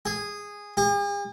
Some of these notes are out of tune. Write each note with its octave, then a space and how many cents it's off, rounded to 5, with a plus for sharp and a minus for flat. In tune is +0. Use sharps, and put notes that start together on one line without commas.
G#4 -10
G#4 -45